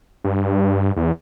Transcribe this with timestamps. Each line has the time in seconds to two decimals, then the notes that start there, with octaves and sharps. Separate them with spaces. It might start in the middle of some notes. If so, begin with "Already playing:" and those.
0.24 G2
0.97 E2